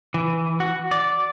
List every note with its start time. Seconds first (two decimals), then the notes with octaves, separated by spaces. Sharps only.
0.14 E3
0.60 F#4
0.91 D5